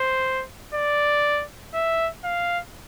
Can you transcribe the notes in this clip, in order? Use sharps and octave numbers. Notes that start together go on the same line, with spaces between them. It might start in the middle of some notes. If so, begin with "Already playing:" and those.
Already playing: C5
D5
E5
F5